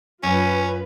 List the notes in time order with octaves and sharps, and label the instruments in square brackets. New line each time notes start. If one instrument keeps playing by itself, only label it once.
[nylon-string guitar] F#2 [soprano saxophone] C#4 [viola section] F4 B4